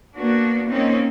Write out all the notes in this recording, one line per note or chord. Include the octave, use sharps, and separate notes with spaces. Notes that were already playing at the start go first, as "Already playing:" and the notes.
A#3 B3 D4 F#4
A#3 C4 C#4 D#4